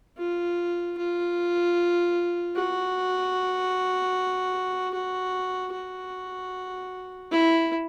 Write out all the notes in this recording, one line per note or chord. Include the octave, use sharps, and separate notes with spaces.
F4
F4
F#4
F#4
F#4
E4